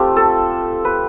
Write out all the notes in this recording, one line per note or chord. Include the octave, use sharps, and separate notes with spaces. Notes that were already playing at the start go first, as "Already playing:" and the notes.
Already playing: A3 C4 F4 G4
A4
B4